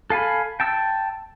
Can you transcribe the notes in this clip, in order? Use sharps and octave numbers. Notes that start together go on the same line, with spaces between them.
A4 F5 G#5 B5
G5 A5 E6